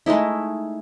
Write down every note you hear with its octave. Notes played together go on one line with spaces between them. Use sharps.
G#3 A3 D#4 E4